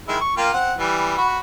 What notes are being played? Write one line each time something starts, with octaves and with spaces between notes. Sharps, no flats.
D#3 G#3 E4
C#6
A#3 F4 G5
C4 F#5
E3 G3
F#4 B5